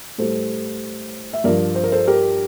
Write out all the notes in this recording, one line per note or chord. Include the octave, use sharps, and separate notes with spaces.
A2 G3 A4 C5
E5
G2 F3 A#4 D5
C5
A#4
A4 C5
G4 A#4